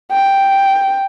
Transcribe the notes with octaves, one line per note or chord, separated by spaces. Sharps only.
G5